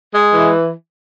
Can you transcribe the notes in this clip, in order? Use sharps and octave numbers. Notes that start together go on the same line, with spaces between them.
G#3
E3